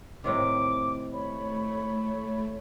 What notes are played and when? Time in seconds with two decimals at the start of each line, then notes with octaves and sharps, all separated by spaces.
0.24 A2 C3 D#3 D6
1.12 A3 C#5 B5